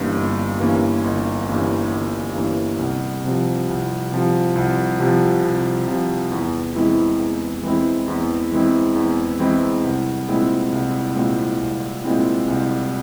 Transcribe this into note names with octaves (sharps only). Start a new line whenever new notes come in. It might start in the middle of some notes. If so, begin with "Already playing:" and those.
Already playing: G1 G2 E3 A#3 C#4
G1
G2 E3 A#3 C#4
G1
G2 E3 A#3 C#4
G1
G2 E3 A#3 C#4
C2
C3 F3
C2
C3 F3
C2
C3 F3
C2
C3 F3
E2
E3 G#3 C4 E4
E2
E3 G#3 C4 E4
E2
E3 G#3 C4 E4
E2
E3 G#3 C4 E4
C2
A#2 G#3 C4 E4
C2
A#2 G#3 C4 E4
C2
A#2 G#3 C4 E4
C2